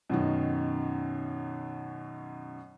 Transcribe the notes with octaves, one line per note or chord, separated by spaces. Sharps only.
F#2 B2 D#3